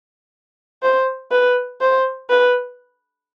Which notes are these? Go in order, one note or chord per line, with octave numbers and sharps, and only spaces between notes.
C5
B4
C5
B4